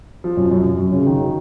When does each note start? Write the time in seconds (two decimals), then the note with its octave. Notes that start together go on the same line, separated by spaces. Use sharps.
0.24 F3
0.37 F#2
0.51 F#2
0.65 F#2
0.79 F#2
0.92 C#3
1.06 D#3
1.21 F#3